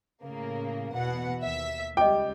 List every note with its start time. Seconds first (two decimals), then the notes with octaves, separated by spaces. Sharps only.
0.24 A2 C#3 A#3
0.94 E2 B2 F#5
1.42 D#2 E5 B6
1.97 C#2 G3 D#5 G5 D6